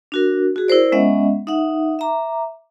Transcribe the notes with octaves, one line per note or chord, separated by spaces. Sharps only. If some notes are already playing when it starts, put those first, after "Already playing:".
D4 F#4 A#4
F#4 G#4
E4 A#4 C5 D5
G#3 B3 C#4 D#5 E5 F#5
D#4 E5 F#5
E5 A#5 D6